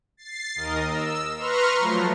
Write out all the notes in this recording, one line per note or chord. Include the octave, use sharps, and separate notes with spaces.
A6 C7
D#2 A#4 D#5
E6
B4 A#5 C6 C#6 F6
F3 F#3 A3